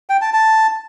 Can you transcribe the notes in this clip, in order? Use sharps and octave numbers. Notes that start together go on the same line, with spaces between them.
G5
A5
A5